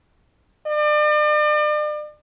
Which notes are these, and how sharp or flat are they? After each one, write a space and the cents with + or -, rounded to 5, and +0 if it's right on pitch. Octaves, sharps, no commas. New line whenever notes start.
D5 +40